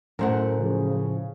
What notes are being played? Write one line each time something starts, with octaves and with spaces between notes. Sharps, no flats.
F#2 A2 A3 A#4 C5 F#5
C#3 F3